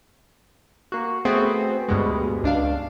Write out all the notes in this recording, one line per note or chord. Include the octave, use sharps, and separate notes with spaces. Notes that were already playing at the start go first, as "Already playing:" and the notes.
A#3 F#4
A3 B3 C4 F#4 G#4
D2 G2 B2 G#3
C#2 D4 F5